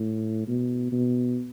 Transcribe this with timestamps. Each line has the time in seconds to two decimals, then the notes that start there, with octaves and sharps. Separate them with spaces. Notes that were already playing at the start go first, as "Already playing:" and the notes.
Already playing: A2
0.48 B2
0.92 B2